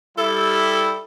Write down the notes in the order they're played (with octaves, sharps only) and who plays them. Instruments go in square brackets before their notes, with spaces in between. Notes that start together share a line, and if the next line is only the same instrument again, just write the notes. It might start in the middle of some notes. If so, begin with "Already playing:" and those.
[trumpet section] G3 E4 [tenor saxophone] A4